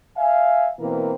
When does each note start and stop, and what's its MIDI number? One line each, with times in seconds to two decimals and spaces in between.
0.17 0.68 76
0.17 0.68 77
0.17 0.68 80
0.80 1.13 47
0.80 1.13 52
0.80 1.13 58
0.80 1.13 60
0.80 1.13 70
0.80 1.13 71